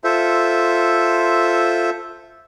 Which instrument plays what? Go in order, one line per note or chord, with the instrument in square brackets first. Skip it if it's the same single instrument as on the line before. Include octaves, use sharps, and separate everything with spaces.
[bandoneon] F4 A4 C5 E5